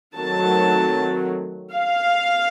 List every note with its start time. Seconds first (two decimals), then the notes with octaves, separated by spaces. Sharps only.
0.15 D#3 F#3 A3 C4 A5
1.74 F5